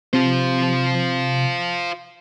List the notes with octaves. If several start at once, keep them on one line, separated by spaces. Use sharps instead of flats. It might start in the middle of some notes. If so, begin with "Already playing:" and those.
C3 F4 C5